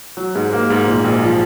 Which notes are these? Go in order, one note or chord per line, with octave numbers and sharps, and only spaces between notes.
F#3
G#2
A#3
G#2
A#2
A#1
F3